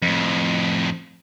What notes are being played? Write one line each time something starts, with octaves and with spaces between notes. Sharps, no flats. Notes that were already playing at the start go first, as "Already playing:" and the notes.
F2 A2